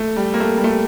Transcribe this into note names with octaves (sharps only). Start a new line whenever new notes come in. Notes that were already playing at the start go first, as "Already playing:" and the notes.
Already playing: A3
G3
A#3
A3
G3
A3